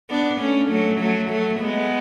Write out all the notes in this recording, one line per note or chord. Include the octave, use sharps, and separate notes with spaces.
B3 D4
A3 C#4
F#3 A3
F#3 A3
F#3 A3
G#3 B3